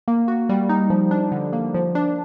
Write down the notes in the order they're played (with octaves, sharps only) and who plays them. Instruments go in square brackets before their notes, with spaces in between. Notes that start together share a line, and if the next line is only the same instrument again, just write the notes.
[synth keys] A#3
F#4
G3
D#4
F3
D4
D3
A#3
F3
D4